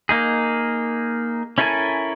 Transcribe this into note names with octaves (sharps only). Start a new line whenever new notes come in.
A#3 D#4 G#4
C#4 E4 A4 A#4 G#5